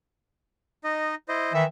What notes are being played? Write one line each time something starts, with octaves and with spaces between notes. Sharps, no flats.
D#4 D#5
E4 C5 D#5
D#3 E3 E5